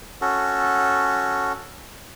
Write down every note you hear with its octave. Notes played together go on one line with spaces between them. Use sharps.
C#4 F#4 A4